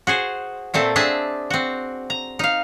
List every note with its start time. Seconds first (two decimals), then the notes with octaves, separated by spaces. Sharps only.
0.07 F#4 G#4 C5
0.74 A#2 A3 C4 A4
0.96 C4 D4 G#4 E5 A5
1.50 C4 F#4
2.10 A#5
2.39 D#4 F5